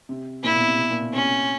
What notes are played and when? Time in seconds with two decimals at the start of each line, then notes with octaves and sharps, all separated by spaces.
0.09 C3
0.43 A#2 E4
0.56 B2
0.67 C3
0.79 B2
0.90 A#2
1.02 B2
1.13 C3 C#4